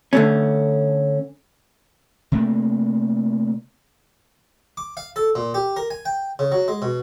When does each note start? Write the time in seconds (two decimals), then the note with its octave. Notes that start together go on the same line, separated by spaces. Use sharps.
0.13 D3 A3 C#4
2.32 C3 A3 A#3
4.77 D6
4.97 F5
5.16 A4
5.35 A#2
5.54 G4
5.77 A#4
5.91 G#5
6.06 G5
6.39 C#3
6.52 F#3
6.68 G#3
6.82 B2